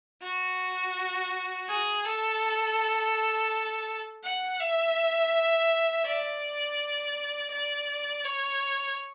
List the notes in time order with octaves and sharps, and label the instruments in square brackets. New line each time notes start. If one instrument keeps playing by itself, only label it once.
[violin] F#4
G#4
A4
F#5
E5
D5
D5
C#5